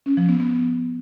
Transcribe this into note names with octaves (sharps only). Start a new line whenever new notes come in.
C#4
F3
B3
B3